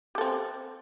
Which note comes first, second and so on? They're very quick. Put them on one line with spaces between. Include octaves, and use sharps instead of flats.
G4 A4 C4